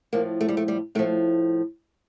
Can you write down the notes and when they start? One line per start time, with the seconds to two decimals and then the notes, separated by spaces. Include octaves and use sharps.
0.13 A2 F3 A#3
0.41 A3
0.48 G3
0.57 A3
0.68 G3
0.95 A2 A3
0.99 F3